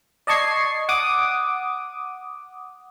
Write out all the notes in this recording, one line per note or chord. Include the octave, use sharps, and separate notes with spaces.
D5 D#5 A5 C#6 G#6 C7
F#5 D6 D#6